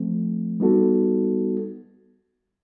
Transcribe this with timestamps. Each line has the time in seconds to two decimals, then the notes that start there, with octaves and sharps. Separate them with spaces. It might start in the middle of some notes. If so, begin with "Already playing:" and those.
Already playing: F3 A3 C4
0.60 G3 B3 D#4 F#4 A4